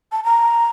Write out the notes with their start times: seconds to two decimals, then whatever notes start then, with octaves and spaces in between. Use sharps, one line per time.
0.12 A5
0.24 A#5